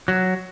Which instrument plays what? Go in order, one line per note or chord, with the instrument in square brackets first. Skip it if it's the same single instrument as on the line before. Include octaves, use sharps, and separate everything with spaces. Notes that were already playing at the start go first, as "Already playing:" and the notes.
[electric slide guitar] F#3